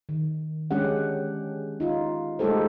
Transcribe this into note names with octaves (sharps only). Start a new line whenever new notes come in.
D#3
G#3 C#4 D4 G4 F#5
D#4 F4
G#3 A3 D#4 G4 A4 C5